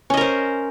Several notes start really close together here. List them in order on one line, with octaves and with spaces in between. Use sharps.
C#4 D#5 A#4 C5